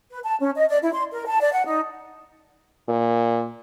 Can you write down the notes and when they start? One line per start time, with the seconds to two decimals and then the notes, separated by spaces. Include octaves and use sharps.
0.10 B4
0.25 A5
0.39 C#4
0.56 D#5
0.69 D5
0.82 E4
0.94 C6
1.12 A#4
1.27 A5
1.41 D5
1.53 F#5
1.65 D#4
2.89 A#2